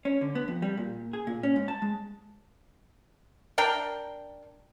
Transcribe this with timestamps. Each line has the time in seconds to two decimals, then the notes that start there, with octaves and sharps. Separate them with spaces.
0.05 C#4
0.21 D3
0.35 B3
0.48 F2
0.62 G3
0.77 A#2
1.13 G#4
1.27 A#2
1.43 C#4
1.56 G#2
1.68 A5
1.82 G#3
3.58 D4 A#4 G5